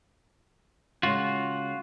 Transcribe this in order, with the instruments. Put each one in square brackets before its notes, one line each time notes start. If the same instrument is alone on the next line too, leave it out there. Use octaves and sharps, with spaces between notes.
[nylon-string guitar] C#3 G#3 C#4 [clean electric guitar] F4 F#4